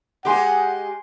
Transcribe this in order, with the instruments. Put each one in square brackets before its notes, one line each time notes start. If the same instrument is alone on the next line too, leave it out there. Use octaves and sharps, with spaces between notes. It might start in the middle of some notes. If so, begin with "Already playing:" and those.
[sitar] G#3 G4 [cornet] F#5 [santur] G#5 C6 D6